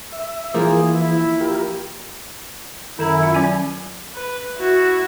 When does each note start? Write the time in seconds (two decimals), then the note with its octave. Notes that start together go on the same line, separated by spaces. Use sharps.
0.12 E5
0.54 E3 F3 A#3 G#4
0.91 E4
1.40 F4 G4 A#4
2.99 F#2 D#3 E4 A4 A#5
3.23 F4
3.34 F#3 C#4 G#5
4.15 B4
4.58 E4 F#4